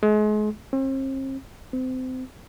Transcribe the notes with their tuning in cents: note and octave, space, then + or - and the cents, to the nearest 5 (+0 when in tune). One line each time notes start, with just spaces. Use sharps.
G#3 +35
C4 +40
C4 -30